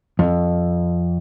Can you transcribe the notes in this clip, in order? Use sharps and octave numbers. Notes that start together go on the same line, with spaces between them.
F2